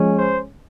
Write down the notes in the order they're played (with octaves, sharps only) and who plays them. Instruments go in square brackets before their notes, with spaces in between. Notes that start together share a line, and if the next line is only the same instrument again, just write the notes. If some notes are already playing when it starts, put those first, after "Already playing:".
Already playing: [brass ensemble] F3 G#3 C#4
C5